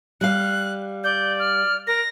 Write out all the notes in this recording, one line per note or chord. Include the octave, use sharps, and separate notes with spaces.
G3 F5 F#6
D5 G6
F6
A#4 A#6